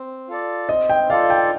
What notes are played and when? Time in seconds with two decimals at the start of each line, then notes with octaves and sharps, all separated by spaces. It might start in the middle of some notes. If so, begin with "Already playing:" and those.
Already playing: C4
0.28 F4 A4 D5
0.69 C4 D#5
0.90 G5
1.10 F4 A4 D5 F5
1.30 G5